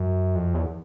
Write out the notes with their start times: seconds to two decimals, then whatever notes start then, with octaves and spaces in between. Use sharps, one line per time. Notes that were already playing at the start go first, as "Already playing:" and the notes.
Already playing: F#2
0.36 F2
0.54 E2